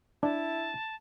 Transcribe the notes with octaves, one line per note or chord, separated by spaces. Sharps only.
D4 E4 A5